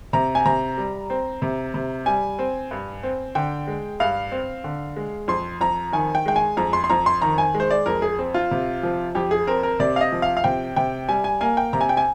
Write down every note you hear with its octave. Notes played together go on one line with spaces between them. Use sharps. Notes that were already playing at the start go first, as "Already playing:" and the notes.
C3 A#5
G#5
C3 A#5
G3
C4
C3
C3
G3 G#5
C4
G2
C4
D3 G5
G#3
G2 F5
C4
D3
G#3
F2 C6
F2 A#5
D#3 G#5
G5
G#3 G5
G#5
F2 A#5
C6
C6
F2 A#5
C6
D#3 A#5
G#5
G#3
C5
D5
F2 A#4
G#4
C4
F4
C3
F3
F2 G4
G#4
C4 A#4
A#4
C3 D5
F5
D#5
F3
F5
F5
C3 G5
C3 G5
G3 G#5
G#5
A#3 G#5
G5
C3 A#5
G#5
G5
G#5